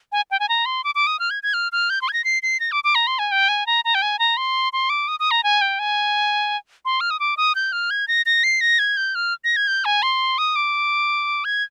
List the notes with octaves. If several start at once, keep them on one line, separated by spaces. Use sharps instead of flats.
G#5
G5
G#5
A#5
C6
D6
D6
D#6
F6
G#6
G#6
F6
F6
G6
C6
G#6
A#6
C7
C7
A#6
D6
D6
A#5
C6
G#5
G5
G#5
A#5
A#5
G5
G#5
A#5
C6
C6
D6
D#6
D#6
A#5
G#5
G5
G#5
C6
F6
D#6
D6
D#6
G6
F6
G#6
A#6
A#6
C7
A#6
G#6
G6
F6
A#6
G#6
G6
G#5
C6
D#6
D6
G#6